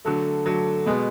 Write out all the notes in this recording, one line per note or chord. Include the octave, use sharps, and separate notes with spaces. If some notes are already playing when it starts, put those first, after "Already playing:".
D3 F#3 A3
D3 F#3 A3
B2 G#3 B3